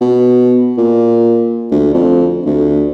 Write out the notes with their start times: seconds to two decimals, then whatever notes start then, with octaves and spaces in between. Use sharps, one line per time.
0.01 B2
0.78 A#2
1.71 D2
1.94 F2
2.46 D2